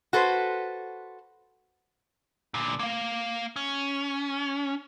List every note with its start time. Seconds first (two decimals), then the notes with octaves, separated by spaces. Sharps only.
0.13 F#4 A4 B4 C5
2.54 A#2 D3
2.79 A#3 F5
3.56 C#4